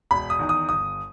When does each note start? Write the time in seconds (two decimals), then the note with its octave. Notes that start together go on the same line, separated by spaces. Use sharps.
0.11 E1 B5
0.30 D#6
0.39 E2 D#3
0.49 D#6
0.69 G1 D#6